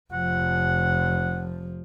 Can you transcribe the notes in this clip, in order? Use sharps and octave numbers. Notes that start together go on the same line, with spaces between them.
F1 F3 F#5